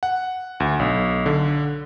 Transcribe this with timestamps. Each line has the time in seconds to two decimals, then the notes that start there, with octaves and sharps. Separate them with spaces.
0.03 F#5
0.60 D2
0.79 B1
1.26 D3